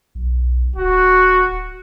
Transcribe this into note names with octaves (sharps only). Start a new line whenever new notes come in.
B1
D1 F#4